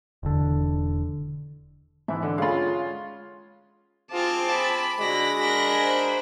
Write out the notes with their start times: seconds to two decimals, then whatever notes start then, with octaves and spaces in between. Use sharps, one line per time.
0.23 E1 D3
2.08 G#2 E3 E5
2.23 D3
2.38 G#3 C#4 F4 F5 B5
4.12 C4 F4 G#4 C5 A5 D6
4.52 B5
5.00 D3 G#3 F#4 D5 A#6
5.40 D4 F#4 A#4 A#6
5.83 C5